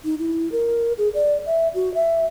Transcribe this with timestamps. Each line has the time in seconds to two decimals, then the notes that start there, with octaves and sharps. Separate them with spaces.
0.05 D#4
0.19 E4
0.52 A#4
0.98 G#4
1.14 D5
1.46 E5
1.74 F#4
1.94 E5